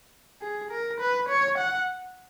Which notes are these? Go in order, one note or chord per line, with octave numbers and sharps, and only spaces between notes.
G#4
A#4
B4
C#5
F#5